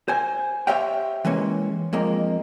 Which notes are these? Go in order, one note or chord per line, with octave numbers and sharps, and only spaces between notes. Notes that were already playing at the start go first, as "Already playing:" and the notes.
C5 G#5
G4 C5 C#5 E5 F5 G5
E3 G#3 A#3 C#4
F2 G#3 A#3